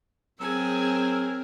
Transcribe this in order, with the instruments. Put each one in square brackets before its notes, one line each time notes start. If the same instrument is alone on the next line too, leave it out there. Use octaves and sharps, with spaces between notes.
[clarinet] F#3 [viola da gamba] C4 A#4 [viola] G#4 G#5 [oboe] E6